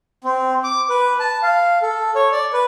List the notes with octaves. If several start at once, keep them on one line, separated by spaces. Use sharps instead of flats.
C4
D6
B4
A5
F5
A4
C#5
D5
B4